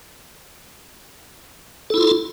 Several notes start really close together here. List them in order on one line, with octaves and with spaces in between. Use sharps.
A4 E4 F4